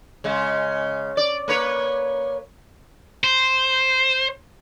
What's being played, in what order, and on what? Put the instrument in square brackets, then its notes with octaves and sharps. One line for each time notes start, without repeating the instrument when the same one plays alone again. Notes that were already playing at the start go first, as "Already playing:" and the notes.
[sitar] C#3 G#3
D5
A#3 B4 C#5
[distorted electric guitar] C5